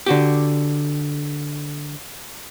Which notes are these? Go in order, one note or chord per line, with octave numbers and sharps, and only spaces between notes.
D3 F#4 G4